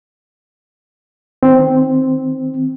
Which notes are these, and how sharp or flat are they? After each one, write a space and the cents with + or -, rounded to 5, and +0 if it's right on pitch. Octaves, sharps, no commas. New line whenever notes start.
D#3 +0 C4 +0